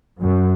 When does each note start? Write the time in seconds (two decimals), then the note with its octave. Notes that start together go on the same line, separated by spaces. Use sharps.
0.20 F#2